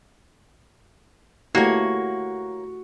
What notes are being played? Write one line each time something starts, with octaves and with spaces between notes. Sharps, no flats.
A3 A#3 E4 F#4 G4 C#5